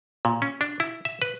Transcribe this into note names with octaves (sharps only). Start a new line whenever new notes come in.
A#2
C#4
D4
E4
E5
B4